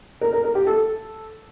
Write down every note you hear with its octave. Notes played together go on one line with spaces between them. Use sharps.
A#4
A#4
A#4
G4
A4